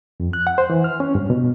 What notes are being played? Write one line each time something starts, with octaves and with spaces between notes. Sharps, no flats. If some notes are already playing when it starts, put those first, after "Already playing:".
F2
F#6
F#5
C5
E3
F6
C#4
G2
B2